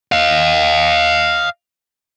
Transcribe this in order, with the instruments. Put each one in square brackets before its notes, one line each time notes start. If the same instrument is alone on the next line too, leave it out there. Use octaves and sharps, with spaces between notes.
[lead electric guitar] D#5 F5